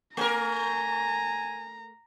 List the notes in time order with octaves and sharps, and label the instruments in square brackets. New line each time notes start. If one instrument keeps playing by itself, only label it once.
[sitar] A3 A#4 [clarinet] G#5 [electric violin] A#5